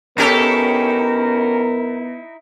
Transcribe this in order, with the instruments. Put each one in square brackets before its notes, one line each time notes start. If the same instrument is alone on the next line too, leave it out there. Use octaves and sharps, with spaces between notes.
[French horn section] F#2 A#4 [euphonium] B3 [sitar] C#4 G4 A4 [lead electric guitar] D#4 E4